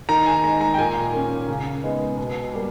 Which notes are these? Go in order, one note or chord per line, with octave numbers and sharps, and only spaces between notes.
D#3 A#5
G#5
G#3 D#4 A#5
A#5
G5
A#2 G#5
A#3 C#4
C#3
G#3 B3 D#4
B2
G3 A#3